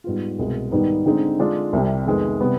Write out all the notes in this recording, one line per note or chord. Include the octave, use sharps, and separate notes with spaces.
G#2 G3 B3 F4
C2 B2 G#3
G#2 D#3 G3 B3 D#4
D3 G#3 C4 D#4
D3 G#3 D4 F4
C2 C3 G3
F2 D#3 G#3 B3
C3 G3 B3